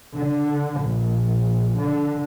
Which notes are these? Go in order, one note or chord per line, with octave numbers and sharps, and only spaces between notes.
D3
A#1
D3